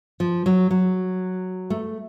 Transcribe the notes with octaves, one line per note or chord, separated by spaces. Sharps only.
F3
F#3
F#3
A3